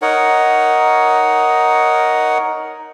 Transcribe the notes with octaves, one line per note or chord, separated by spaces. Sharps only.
D#4 A#4 C#5 F#5